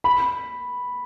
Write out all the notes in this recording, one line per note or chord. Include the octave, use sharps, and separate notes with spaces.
B5